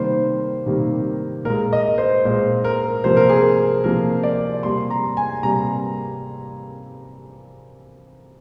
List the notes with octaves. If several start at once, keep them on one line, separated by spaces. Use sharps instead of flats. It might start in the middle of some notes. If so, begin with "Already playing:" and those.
Already playing: C3 D#3 G3 A#3 C5
C3 D#3 G3 A#3
A#2 G#3 A#4
D#5
C5
A#2 G#3 C5
A#4
C3 F3 A#3 C5
A#4
G#4
A#4
C3 F3 A#3 A#4
D5
C3 G3 A#3 C6
A#5
G#5
C3 G3 A#3 A#5